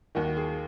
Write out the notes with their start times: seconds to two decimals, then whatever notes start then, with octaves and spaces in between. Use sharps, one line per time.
0.15 D#2 D#3 F#4
0.37 G#4